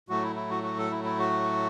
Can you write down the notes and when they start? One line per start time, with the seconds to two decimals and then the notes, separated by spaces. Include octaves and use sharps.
0.09 A2 F#3 A3 F#4
0.23 E4
0.36 E4
0.50 F#4
0.63 F#4
0.78 A4
0.91 E4
1.04 E4
1.19 F#4